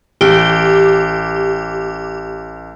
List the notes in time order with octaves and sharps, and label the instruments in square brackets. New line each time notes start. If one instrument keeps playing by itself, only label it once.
[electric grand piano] A1 [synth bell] G4